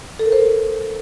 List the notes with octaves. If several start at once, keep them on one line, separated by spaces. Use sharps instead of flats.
A4
A#4
C5
A#4